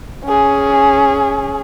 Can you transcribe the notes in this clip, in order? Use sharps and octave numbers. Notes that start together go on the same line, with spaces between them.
C#4 G#4